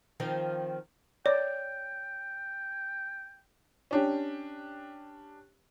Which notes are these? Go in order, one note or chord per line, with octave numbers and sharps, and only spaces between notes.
D#3 F3 C4
C#5 D5 G5
C#4 D4 G4